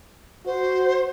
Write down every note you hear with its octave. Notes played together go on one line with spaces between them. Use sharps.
F#4 C5